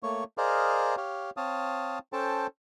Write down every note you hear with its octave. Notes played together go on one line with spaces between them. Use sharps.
A3 A#3 C#5 C#6
G#4 A#4 C5 D5 D#5 F5
G4 C#5 F5
C4 C#5 F5 A5 D#6
C#4 A4 C5 G5 A5